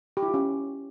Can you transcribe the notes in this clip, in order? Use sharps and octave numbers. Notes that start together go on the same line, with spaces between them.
G4
E4
F4
C#4